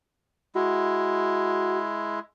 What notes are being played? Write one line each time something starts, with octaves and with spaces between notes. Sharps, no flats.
G#3 E4 F#4